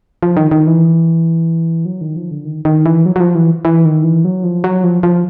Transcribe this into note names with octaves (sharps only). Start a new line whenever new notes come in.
F3
D#3
D#3
E3
F#3
D#3
F3
D3
D#3
D#3
E3
F#3
F#3
F3
E3
E3
D#3
E3
F#3
F3
F#3
F3
F3